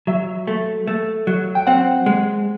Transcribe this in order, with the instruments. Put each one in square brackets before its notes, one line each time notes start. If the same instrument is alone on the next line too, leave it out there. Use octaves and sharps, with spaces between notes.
[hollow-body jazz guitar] F#3 [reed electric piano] E5
[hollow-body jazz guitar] A3
A3
F#3
[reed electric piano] G5
[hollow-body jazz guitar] C4 [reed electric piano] F#5
[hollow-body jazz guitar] G#3